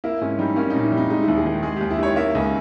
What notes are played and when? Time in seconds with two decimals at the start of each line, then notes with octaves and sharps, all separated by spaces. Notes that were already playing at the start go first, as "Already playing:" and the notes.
0.04 A#3 E4
0.21 G#2 C#4
0.39 G3 D#4
0.56 A#3 C#4
0.70 A#2 D#4
0.83 E4
0.92 G3
0.97 D#4
1.09 G#3 D#4
1.23 E4
1.28 D#2
1.36 G#4
1.46 D#3
1.63 G#3 G#4
1.76 D#2 G4
1.91 E4
1.99 D#3 C#5
2.16 A#3 E5
2.35 C#2 D#5